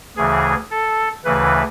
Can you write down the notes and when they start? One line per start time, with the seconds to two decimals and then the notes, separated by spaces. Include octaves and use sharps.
0.17 D2 C#3 E3 G#4
0.71 A4
1.25 D2 C#3 E3 B4